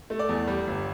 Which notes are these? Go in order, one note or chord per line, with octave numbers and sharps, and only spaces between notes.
A3
D5
E2
G3
G1